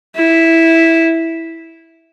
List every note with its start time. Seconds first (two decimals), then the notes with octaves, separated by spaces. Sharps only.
0.16 E4